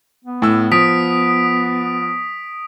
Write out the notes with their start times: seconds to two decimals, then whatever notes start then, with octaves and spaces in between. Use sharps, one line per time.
0.24 B3
0.42 A2 E6
0.72 F3 D#6 B6 D7